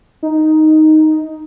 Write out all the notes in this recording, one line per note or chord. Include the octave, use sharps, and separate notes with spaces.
D#4